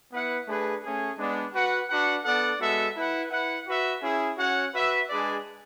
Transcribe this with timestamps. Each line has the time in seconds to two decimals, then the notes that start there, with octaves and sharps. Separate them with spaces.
0.12 B3 E4 B4 F#5
0.47 A3 D4 G#4 B4
0.83 A3 C#4 G#4
1.18 G#3 B3 D4
1.54 F#4 B4 F#5
1.89 D4 F#4 B4 F#5
2.25 B3 D4 A4 D5 F#5
2.60 G#3 B3 F#4 A4 E5
2.95 E4 B4 F#5
3.31 E4 B4 F#5
3.68 F#4 B4 E5
4.03 C#4 E4 G#4
4.38 C#4 F#4 C#5 F#5
4.73 F#4 B4 E5
5.09 G#3 D4 G#4 B4 D5